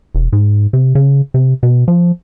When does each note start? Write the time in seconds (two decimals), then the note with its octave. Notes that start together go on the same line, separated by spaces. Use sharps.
0.15 E1
0.33 G#2
0.73 C3
0.95 C#3
1.34 C3
1.63 B2
1.88 F3